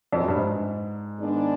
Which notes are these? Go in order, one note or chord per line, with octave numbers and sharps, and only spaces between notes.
F2
F#2
G2
G#2
D#3 G#3 B3 D4